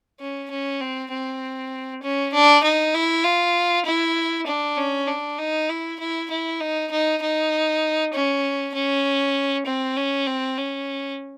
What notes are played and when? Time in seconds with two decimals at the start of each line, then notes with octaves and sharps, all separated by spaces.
0.20 C#4
0.50 C#4
0.81 C4
1.11 C4
2.03 C#4
2.34 D4
2.64 D#4
2.94 E4
3.24 F4
3.86 E4
4.47 D4
4.77 C#4
5.08 D4
5.38 D#4
5.69 E4
6.00 E4
6.30 E4
6.61 D#4
6.91 D#4
7.22 D#4
8.14 C#4
8.75 C#4
9.66 C4
9.97 C#4
10.27 C4
10.58 C#4